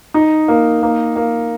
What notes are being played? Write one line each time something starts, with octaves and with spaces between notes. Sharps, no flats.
D#4
A#3
A#3
A#3